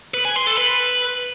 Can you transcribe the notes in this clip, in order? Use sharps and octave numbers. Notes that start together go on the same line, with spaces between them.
B4
G#5
C6
A4
B4